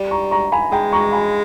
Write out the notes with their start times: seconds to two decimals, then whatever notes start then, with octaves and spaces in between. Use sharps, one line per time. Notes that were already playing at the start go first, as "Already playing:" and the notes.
Already playing: G3
0.11 A#5 C#6
0.31 A#5 C#6
0.52 G#5 B5
0.72 G#3 G5 A#5
0.93 A#5 C#6
1.13 G#5 B5